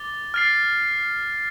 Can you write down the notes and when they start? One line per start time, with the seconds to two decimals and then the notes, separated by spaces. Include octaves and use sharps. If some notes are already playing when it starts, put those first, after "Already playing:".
Already playing: D6 A6 G7
0.34 F6 A6 C7